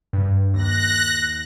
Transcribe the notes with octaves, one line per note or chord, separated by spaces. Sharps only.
G2
D#2 F#6 A#6